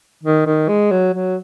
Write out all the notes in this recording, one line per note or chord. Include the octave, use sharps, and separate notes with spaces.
D#3
D#3
G#3
F#3
F#3